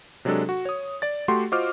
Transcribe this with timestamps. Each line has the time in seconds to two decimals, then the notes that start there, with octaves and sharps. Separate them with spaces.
0.25 C3 F#3 G#3 D4 A4
0.49 F#4
0.65 C#5 D#6
1.02 D5 A6
1.28 A3 F#4 G4 F#5 C6
1.52 F4 F#4 C5 D#5 D6 F6